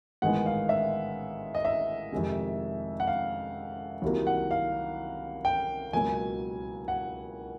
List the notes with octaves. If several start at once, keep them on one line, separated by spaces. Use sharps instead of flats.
A1 G#2 D#3 G#3 B3 F#5
F5
E5
D#5
E5
F2 C3 D#3 G#3
F#5
F5
C2 C3 D#3 F#3 A#3
F#5
F5
G5
C#2 B2 F#3 A#3 G#5
F#5